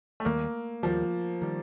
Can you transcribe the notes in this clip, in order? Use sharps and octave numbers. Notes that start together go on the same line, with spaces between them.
A3
D#2 D#3 G3 A#3
D#2 D#3 F3 G3
D#3 G3